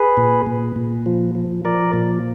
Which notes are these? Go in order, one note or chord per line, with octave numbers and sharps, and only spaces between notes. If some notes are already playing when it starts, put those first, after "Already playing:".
Already playing: G#4 B4
A#2
A#2
A#2
F3
F3
F3 A#4 D5
A#2